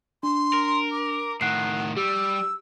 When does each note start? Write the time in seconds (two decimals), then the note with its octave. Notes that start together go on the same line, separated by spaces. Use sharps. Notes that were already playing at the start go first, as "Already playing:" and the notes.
0.23 D4 C6
0.53 A#4
0.91 D6
1.41 A2 D#3 F#5 F#6 C7
1.97 G3 G4 E6